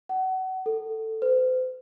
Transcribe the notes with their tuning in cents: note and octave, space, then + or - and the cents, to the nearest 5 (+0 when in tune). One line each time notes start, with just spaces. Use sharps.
F#5 +30
A4 +10
C5 -40